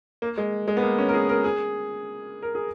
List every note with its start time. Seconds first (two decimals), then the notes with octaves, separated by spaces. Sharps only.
0.22 A#3
0.38 G#3
0.68 G#3
0.77 B3
0.82 A#3
0.98 C#4
1.09 A#4
1.14 G#4
1.29 A#4
1.44 G#4
2.42 A#4
2.55 G#4